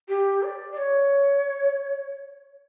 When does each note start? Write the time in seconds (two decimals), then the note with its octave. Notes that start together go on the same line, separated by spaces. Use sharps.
0.08 G4
0.43 D5
0.72 D5
0.77 C#5